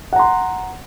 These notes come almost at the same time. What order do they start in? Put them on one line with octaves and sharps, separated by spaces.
F#5 A#5 C6